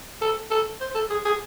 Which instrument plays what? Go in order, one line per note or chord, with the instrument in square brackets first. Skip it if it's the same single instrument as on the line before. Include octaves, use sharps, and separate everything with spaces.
[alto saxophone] A4
A4
C5
A4
G#4
G#4